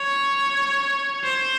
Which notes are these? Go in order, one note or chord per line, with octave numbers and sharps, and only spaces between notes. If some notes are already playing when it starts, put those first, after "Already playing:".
Already playing: C#5
C5